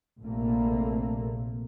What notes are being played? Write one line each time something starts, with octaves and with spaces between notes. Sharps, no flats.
A#1 C3 A3 A#3